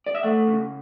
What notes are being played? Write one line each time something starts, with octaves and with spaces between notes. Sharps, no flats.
D5
E5
A3 F#5
C#3